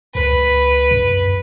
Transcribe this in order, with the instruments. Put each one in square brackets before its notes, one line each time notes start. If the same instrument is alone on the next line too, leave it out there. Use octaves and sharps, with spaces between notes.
[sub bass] C#2 [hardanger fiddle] B4
[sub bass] F#2